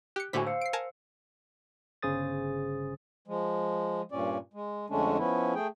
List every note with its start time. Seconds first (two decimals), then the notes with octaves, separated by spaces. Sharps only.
0.16 G4 F#6 C#7
0.33 A2 D3 E4 F#4 C5 G#5 B6
0.46 C5 F5 E6 C#7
0.61 C7 D7
0.73 A#4 G#5 A5
2.02 G1 C#3 G#4 C5 D#6 A6
3.28 F3 G#3
4.12 G2 A#2 C#4 D5
4.54 G#3
4.90 F2 D3 G#3 A3 C#4 D4
5.18 F3 B3 C#4 E4
5.55 A3 G#4 G5